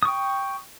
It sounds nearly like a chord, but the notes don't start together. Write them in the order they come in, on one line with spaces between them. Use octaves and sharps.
D#6 C#6 G5